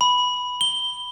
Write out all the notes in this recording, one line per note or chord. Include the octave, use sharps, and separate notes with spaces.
B5
G7